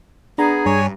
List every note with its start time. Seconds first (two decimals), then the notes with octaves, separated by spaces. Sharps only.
0.38 B3 D4 G#4 A#5
0.66 G2 C#5 G#5